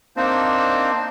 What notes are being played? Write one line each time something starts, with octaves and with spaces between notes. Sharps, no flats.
A#3 C4 D4 D#4 C5